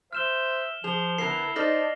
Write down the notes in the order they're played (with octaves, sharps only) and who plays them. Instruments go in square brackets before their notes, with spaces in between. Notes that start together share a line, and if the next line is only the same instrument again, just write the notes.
[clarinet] C5 [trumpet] E5 [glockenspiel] F6 E7 G7
[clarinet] F3 [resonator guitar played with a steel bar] G#4 [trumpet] C5 [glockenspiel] F7 G7
[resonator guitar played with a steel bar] D3 B3 A#4 [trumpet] E4 [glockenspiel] C7
[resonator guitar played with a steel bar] D#4 A4 C5 [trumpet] D5 [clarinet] D#5 [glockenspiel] F6 A#6 F#7